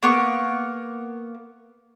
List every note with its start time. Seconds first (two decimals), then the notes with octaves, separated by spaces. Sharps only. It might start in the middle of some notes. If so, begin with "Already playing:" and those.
0.03 A#3 B3 C#6